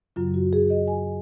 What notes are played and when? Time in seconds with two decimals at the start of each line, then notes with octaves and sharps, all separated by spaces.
0.16 F#2 C#3 F#3 F4
0.34 F#4
0.53 G#4
0.70 D#5
0.88 G#5